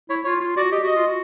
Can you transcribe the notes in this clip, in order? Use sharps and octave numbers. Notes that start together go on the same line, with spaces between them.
E4 C#5
F4 C#5
F4
F#4 D5
G4 D#5
F#4 D#5
F4
F#4